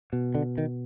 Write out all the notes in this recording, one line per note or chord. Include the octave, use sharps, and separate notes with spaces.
B2
D3
D#3